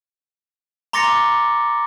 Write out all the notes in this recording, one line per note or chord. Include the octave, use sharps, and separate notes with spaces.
A#5 C6 D6 A6 A#6 C#7